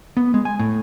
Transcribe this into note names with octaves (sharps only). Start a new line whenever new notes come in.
B3
G#3
G#5
A2